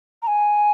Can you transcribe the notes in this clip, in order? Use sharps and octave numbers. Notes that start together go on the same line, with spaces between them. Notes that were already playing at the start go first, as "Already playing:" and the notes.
A#5
G#5